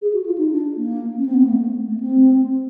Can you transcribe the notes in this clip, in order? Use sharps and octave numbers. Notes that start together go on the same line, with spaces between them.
G#4
F#4
F4
D#4
D4
A#3
C#4
C4
B3
A#3
A3
A3
C4